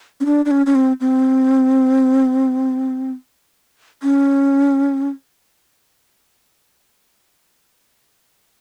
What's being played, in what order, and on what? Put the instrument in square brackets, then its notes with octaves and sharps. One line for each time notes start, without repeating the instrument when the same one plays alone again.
[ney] C#4
D4
D4
C#4
C#4
C4
C4
C#4